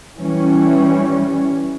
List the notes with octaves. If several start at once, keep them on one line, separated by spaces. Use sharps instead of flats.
E3 G3 C#4